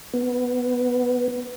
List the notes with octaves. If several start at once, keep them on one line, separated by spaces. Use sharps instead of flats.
B3